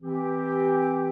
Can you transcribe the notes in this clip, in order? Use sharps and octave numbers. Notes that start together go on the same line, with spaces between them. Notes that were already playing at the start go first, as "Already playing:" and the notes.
E3 C4 G4